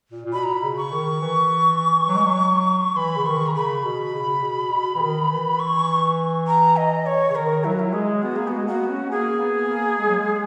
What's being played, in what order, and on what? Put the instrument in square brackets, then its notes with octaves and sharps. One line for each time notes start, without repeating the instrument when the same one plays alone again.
[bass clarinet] A#2
A#2
[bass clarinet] B2 [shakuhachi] B5
[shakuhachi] A#5
B5
[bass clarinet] C#3
[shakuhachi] C#6
[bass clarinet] D#3
E3
F#3
G#3
F#3
[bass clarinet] E3 [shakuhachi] B5
[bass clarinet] C#3
[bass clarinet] D#3 [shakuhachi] C#6
[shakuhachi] A#5
[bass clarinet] C#3 [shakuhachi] B5
[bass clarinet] B2
C#3
B2
B2
E3
D#3
E3
[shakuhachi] C#6
A#5
D#5
C#5
[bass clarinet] C#3
[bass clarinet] D#3 [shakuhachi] A#4
[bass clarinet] F#3 [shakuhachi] E4
[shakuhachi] F#4
E4
[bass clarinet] G#3 [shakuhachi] G#4
[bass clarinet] B3 [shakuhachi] F#4
[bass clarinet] A#3 [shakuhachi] G#4
[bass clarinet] B3 [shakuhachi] F#4
[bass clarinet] G#3
[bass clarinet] A#3 [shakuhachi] F#4
[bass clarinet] B3
C#4
[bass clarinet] A#3 [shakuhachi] G#4
[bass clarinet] B3
A#3
G#3
F#3
G#3